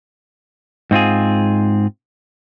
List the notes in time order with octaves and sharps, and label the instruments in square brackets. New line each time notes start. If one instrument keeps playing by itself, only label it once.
[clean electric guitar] G#2 C4 F4 G#4